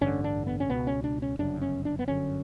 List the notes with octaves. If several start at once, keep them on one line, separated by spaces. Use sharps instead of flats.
A1 G2 D3 C#4
D4
B3
C#4
C#2 B2 B3
C#4
D4
C#4
G1 F#2 C#3 D4
C#4
D4
B3
G1 F#2 D3 C#4